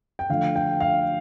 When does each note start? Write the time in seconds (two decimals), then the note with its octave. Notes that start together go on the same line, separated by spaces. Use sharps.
0.19 G5
0.29 D3 F3 A3 F5
0.56 G5
0.80 F5